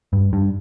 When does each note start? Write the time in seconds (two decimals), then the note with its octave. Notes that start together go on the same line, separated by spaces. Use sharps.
0.13 G2
0.33 G2